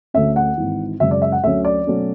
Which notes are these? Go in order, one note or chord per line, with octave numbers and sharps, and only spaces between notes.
D2 D3 A3 C#4 E5
F#5
G#1 G#2 E3
F#2 C#3 G#3 C#4 E5
D5
E5
F#5
D2 D3 F#3 C#4 E5
D5
B2 F#3 A3 C#4